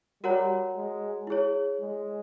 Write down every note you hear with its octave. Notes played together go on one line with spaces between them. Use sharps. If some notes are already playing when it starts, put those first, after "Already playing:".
G3 F#4 A#4 C#5 F#5 A#5
G#3
E4 G#4 C#5
G#3